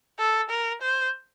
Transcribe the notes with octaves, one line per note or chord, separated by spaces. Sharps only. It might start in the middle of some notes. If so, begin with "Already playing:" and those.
A4
A#4
C5